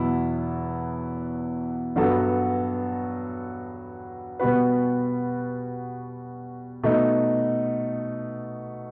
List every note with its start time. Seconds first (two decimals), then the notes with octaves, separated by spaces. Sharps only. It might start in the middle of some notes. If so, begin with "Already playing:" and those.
Already playing: E2 B2 F#3 B3 E4
1.96 G2 F#3 B3 F#4 A4
4.40 B2 G3 B3 F#4 B4
6.83 B2 A3 D#4